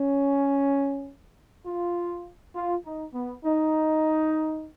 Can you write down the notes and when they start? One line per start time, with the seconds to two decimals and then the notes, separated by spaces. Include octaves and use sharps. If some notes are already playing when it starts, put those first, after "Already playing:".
Already playing: C#4
1.67 F4
2.56 F4
2.85 D#4
3.14 B3
3.45 D#4